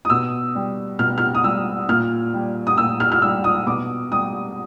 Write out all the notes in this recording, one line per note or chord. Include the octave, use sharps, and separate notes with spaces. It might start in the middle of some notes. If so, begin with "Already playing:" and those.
D#6
B2 E6
G3
B2 F6
F6
D#6
G3 E6
A#2 F6
G3
D#6
A#2 E6
F6
F6
G3 E6
D#6
B2 D6
G3 D#6